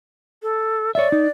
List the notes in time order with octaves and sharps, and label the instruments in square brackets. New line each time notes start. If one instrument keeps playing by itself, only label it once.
[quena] A4
[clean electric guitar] C#5 E5 [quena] D5
[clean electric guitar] D#4